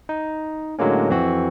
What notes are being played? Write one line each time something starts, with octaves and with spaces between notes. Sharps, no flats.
D#4
A2 D3 F#3 G#3 A#3 C#4
F2 E3 C4 F#4